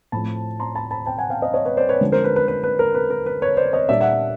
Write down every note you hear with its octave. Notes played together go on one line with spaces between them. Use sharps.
A2 F3 A3 C4 A5 B5
A#5 C6
A5 B5
A5 B5
G5 A5
F#5 G#5
F5 G5
D#5 F5
C#5 D#5
B4 C#5
C5 D5
B4 C#5
D3 F3 G#3 C#4
A#4 C5
B4
B4
B4
B4
A#4
B4
A#4
B4
B4 C#5
C5 D5
C#5 D#5
A#2 G3 A#3 D4 D5 E5
E5 F#5